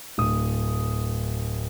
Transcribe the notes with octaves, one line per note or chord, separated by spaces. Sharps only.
D1 D#6